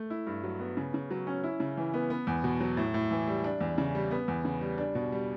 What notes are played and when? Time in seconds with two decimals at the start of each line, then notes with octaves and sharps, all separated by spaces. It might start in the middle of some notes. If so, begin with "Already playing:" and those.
Already playing: A3
0.10 E4
0.27 G2
0.43 F#3
0.60 B3
0.77 C#3
0.94 C#3
1.10 F#3
1.27 C#4
1.44 E4
1.60 C#3
1.77 E3
1.93 B3
2.10 B3
2.27 E2
2.44 B2
2.60 F#3
2.77 A2
2.94 A2
3.11 E3
3.27 G3
3.44 D4
3.61 E2
3.78 C#3
3.95 G3
4.11 B3
4.28 E2
4.45 C#3
4.61 G3
4.78 D4
4.95 B2
5.12 G3